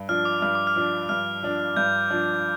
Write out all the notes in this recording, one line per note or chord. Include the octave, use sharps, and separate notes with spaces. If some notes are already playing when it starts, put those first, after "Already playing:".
Already playing: G2
F3 D4 F6
D6
G2 F6
D6
F6
F3 D4
G2 F6
F3 D4
G2 G6
F3 D4